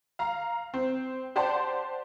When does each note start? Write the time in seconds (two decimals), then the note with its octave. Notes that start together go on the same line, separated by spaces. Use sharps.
0.19 F5 A#5
0.74 C4
1.36 G4 C5 D5 F#5 A5 C6